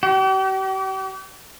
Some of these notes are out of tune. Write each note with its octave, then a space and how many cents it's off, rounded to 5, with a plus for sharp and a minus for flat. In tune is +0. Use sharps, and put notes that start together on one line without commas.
G4 -40